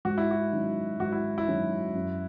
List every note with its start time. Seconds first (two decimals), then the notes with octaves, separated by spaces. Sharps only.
0.05 G#2 F#4
0.18 E4
0.31 F#4
0.52 D#3 F#3 C#4
1.00 G#2 F#4
1.12 E4
1.38 E4
1.48 D#3 F#3 C#4
1.95 F#2